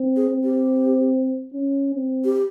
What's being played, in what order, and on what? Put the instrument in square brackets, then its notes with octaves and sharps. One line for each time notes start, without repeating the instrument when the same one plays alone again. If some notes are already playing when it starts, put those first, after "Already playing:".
Already playing: [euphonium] C4
[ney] G#4
[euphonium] C4
[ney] G4
[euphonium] C#4
C4
[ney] G4